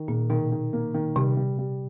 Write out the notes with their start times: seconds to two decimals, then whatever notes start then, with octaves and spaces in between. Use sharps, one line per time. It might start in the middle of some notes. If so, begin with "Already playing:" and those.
Already playing: D#3
0.08 A#2 A#3
0.30 B2 D#3
0.52 D#3
0.73 A#3
0.94 D#3
1.16 C3 G3
1.37 G3
1.59 G3